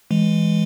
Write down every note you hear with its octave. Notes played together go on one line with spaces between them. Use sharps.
E3 G#3